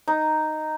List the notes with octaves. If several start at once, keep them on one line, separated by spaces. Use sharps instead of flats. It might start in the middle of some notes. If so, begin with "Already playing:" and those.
D#4